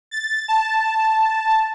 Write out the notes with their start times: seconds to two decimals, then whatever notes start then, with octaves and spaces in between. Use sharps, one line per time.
0.11 A6
0.48 A5